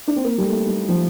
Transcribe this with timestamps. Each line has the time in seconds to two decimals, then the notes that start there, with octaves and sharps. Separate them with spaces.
0.07 D4
0.16 C4
0.24 A#3
0.38 G3
0.45 A3
0.67 G3
0.88 F3